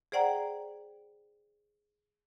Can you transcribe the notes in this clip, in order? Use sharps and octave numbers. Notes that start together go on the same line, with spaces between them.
G#4 C5 D5 F#5 G5 A#5